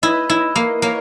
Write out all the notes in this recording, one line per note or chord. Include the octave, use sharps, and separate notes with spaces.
E4 B4 D#5
E4
A#3
A#3 A#4 C#5